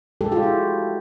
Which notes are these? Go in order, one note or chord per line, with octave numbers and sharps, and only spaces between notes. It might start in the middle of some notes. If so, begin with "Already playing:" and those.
G#3 G4 A4
G#3 F4 G4
E4 F#4